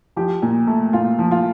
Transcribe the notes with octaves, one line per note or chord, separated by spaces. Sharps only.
F3 G4
A#2
A3
A#2 F4
F3
F4